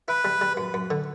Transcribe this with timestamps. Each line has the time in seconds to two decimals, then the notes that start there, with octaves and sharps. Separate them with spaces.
0.08 E4 B4
0.25 G3
0.41 G3
0.57 F#2
0.74 F#2
0.90 D3